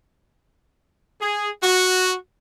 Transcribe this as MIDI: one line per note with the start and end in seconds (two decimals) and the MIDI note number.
1.21 1.50 68
1.63 2.14 66